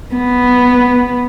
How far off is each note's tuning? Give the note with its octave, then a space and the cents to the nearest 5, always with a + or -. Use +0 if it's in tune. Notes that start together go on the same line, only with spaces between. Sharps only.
B3 +0